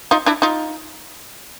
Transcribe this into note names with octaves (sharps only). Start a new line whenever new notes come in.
D#4 F4
D4 E4
D#4 F4